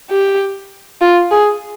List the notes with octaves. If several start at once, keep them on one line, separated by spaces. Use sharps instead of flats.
G4
F4
G#4